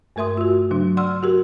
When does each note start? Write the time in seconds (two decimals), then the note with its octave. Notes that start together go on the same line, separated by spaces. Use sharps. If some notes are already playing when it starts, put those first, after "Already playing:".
0.16 G2 A3 A#4 E5 C6 D#6
0.37 F4 F#4
0.71 C#3 F#3 D4
0.97 D5 F#5 C6 E6 F6
1.23 F#4 G4 A#4